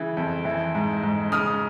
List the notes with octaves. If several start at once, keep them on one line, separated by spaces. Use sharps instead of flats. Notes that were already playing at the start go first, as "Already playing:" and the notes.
Already playing: C#3 E3
F2
E3
G#2
G#2
C#3 D#6 F6